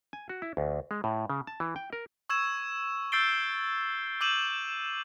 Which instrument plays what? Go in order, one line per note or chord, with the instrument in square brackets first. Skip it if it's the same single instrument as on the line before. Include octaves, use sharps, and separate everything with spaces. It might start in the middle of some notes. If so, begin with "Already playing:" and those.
[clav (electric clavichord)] G#5
F#4
E4
D2
G#3
A2
C#3
A5
E3
G5
A#4
[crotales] C#6 E6 G#6 E7
E6 G6 A6 C7 D7 G7
D6 E6 G6 D#7 E7 F#7